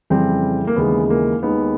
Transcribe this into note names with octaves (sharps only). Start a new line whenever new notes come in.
F2 C#3 E3 G3 C4
A#3
D#2 C#3 E3 G#3 B3
A#3
D#2 D#3 G#3 B3